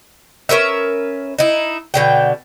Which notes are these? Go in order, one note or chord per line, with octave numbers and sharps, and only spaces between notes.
C#4 A#4 B4 E5
D#4 E4
B2 D3 G5